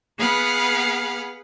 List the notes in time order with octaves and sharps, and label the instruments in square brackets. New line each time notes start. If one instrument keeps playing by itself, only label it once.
[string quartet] B3 G#4 B4 F5 F#5